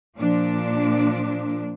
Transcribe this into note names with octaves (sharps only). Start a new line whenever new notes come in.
A#2 F3 D4